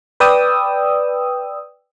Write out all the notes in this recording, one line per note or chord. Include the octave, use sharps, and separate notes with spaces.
B4 D5 G5 D#6 E6